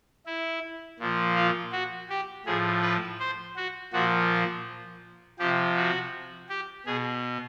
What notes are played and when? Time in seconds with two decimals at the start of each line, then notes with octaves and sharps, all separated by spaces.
0.26 E4
0.99 A#2 F3
1.36 F4
1.72 F#4
2.10 G4
2.46 A2 F3 G#4
2.82 B4
3.20 C5
3.56 F#4
3.93 A#2 F3 F#4
5.39 C3 F3 G4
5.77 F#4
6.49 G4
6.86 B2 G#4